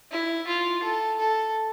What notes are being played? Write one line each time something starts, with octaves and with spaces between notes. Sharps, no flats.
E4
F4
A4
A4